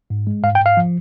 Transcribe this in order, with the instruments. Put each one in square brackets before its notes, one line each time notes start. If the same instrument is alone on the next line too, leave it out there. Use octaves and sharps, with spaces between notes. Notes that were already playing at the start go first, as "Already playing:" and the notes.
[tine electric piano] G#2
G#3
G#2 F5
G5
G#2
F5
F3